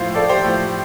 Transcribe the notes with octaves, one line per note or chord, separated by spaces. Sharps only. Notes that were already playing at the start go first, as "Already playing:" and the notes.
Already playing: A2 F3 C5 F5
A4 D5
G4 C5
A2 F3